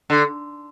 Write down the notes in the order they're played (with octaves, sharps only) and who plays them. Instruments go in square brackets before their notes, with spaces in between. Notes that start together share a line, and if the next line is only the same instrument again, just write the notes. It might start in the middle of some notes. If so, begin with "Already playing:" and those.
[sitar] D3